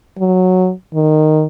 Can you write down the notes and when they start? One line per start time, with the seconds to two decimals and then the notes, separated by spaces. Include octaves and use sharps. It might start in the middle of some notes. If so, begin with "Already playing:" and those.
0.19 F#3
0.94 D#3